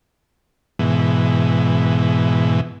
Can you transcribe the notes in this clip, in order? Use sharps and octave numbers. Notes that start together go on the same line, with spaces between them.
G#2 B2 E3